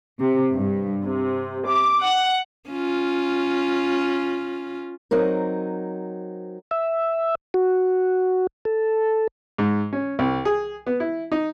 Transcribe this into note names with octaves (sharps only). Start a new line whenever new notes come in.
C3
G2
C3
D6
F#5
C#4 F4
F#3 C4 D#4 A#4
E5
F#4
A4
G#2
C#4
C2
G#4
B3
E4
D#4